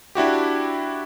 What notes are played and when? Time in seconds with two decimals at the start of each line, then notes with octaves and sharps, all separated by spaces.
0.15 D4 E4 F#4 G4